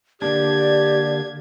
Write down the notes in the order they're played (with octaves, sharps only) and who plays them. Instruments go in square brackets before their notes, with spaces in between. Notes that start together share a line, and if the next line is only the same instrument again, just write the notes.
[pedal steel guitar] D3 A#3 D4 [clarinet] G4 [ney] D5 [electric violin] G#6